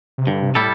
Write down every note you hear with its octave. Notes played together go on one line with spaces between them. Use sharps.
C3
G2 D3
C3
A2 G3 E4 A4